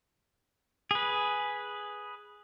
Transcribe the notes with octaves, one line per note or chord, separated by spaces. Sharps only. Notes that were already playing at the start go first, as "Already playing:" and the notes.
G#4 B4